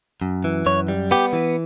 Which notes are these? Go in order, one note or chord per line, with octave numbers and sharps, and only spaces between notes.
F#2
E3
F#2 C#5
G3
B3 G4
E3